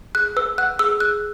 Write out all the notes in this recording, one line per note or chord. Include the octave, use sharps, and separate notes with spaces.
G#4 F#6
B4 E6
F#5 F#6
G#4 E6
G#4 F#6